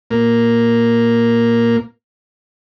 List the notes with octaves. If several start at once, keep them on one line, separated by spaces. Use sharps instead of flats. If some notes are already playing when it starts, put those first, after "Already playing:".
A#2 A#3